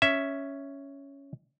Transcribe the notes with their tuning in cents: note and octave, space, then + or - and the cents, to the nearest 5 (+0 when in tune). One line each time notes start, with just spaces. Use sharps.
C#4 +5 E5 +0